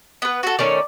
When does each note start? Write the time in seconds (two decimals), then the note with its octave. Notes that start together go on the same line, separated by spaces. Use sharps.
0.22 B3 B4
0.43 F#4 A4
0.59 D#3 A3 C#4 D5